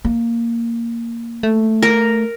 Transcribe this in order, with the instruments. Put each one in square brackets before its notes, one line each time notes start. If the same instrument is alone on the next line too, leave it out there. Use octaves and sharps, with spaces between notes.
[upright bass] A#3
[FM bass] A3
[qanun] A#4